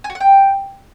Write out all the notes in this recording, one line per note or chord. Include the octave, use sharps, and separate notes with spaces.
G#5
F#4
F#5
G5